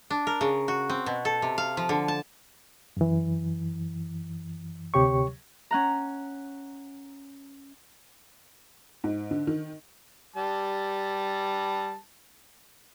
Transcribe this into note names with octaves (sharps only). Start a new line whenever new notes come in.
D4
A#4
C#3
F#4
C4
B2
A4
C3
F5
F3
D3
A5
F#2 E3
D2 C3 G4 C#5 C#6
C#4 F#5 A#5
G#2
D3
D#3
G3 A5